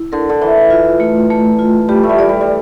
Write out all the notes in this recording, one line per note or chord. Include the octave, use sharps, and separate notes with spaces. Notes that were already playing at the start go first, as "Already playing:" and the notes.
Already playing: E4
D3 A#4
D3
E3 E4
F4
A3
A3
F4
G3 G4
A3
G3
D5
G3
G3